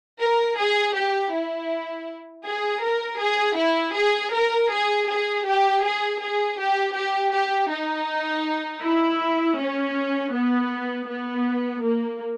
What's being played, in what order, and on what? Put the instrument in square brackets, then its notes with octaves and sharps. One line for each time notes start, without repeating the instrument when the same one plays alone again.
[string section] A#4
G#4
G4
E4
G#4
A#4
G#4
E4
G#4
A#4
G#4
G#4
G4
G#4
G#4
G4
G4
G4
D#4
E4
C#4
B3
B3
A#3